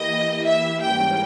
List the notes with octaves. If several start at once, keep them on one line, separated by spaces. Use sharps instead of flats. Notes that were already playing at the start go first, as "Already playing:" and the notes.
Already playing: E3 A#3 E4 G4 D#5
E5
G#2 E3 G3 A#3 C#4 G5